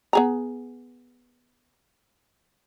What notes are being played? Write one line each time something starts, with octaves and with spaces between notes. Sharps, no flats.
B3 G#4 A#5